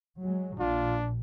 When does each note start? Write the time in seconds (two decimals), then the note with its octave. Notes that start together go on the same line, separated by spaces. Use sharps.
0.21 F#3 G#3
0.60 A#1 A#2 D4 F4